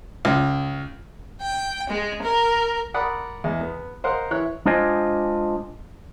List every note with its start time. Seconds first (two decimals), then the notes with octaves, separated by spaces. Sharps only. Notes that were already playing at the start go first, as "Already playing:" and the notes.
0.25 C#2
1.42 G5
1.90 G#3
2.22 A#4
2.94 A#4 D5 F#5 B5 D#6
3.44 E2 G#3
3.61 B3
4.04 A#4 C5 D#5 F5 F#5
4.31 E3 E4 C#5 F#6
4.66 G#3 D4 F4 C5 D#5 G#5